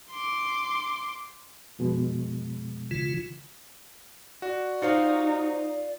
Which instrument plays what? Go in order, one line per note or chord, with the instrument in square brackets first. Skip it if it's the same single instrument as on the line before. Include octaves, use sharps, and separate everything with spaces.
[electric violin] C6 D6
[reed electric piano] F2 B2 G#3
[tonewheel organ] C#3 E3 F4
[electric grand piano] F#4 [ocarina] D5
[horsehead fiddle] D#4 [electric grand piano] F4 [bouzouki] F#4 C5 F5